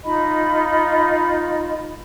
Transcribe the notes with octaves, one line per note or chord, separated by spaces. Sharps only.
D#4 F4 D#5 B5